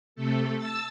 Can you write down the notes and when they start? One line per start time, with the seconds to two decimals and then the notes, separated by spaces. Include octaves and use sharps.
0.15 C3 A3 A4
0.57 A5 E6 A6